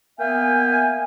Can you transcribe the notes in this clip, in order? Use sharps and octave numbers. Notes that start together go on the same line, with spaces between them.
A#3 B3 E5 F5 G5 G#5